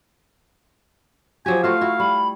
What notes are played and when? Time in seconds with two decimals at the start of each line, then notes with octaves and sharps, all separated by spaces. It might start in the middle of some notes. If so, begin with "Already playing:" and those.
1.46 F3 F#3 G4 G#5
1.64 A3 F4 F#4 F5
1.81 E4 F#4
2.00 G3 B5